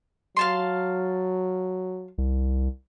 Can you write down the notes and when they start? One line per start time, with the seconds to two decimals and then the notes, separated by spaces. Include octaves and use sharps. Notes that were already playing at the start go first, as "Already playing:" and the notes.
0.37 F#3 F5 A5 C6
2.18 C2